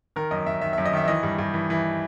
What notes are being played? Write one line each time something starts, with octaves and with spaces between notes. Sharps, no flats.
D#3 A#4
F#2 D#5
F#2 E5
D#3 E5
F#2 E5
D#5
D#3 E5
E5
E3 D#5
G2
G2
E3
E3